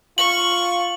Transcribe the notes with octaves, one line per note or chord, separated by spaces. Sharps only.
F4 C#6 F#7